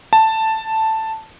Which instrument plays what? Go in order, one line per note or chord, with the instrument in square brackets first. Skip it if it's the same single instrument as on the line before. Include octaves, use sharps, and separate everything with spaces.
[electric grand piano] A5